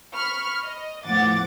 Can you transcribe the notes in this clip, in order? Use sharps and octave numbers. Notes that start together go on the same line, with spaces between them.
B5 C#6 F6
D#5
E2 A2 F3 F#5 D6 A6